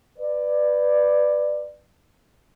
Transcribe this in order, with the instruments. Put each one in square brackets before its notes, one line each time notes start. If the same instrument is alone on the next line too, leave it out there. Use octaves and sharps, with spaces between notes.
[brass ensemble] B4 D5